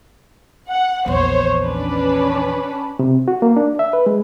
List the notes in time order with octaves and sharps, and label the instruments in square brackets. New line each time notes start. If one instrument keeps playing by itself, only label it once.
[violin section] F#5
[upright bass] A#1 E2 [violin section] C5 C#5
[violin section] C#4 D4 B4
[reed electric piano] C3
F#4
A#3
D4
E5
B4
G#3